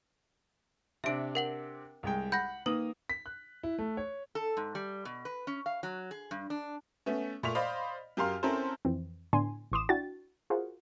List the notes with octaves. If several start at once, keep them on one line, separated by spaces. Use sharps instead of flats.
C3 C4 D4 E5 D7
A#4 F#5 F#7
C2 G#3 G5
F#5 B5 G6 A#6
D#3 A#3 B4 D#6 F#7
B6
F#6
E4
A3
C#5
A4
G#2
G3
B2
B4
C#4
F5
F#3
G#4
G2
D4
A3 B3 C#4
A#2 A3 C#6 B6 F7
C5 D5 D#5 F5 B5
F#2 G4 A#4 F5 C6 F6
C4 C#4 E4 A4 A#4 C5
F2 E3 C4
A2 D3 B3 D4 G#5 C6
A1 E3 C6 D6 D#6 E7
D4 E4 F#4 G5 A6
F4 F#4 G#4 A#4 C5 F#5